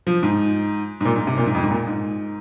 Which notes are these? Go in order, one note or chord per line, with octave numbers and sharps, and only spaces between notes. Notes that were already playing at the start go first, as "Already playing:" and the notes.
F3
G#2
G#2
A#2
G#2
C3
A#2
G#2
F2
G#2
A#2
G#2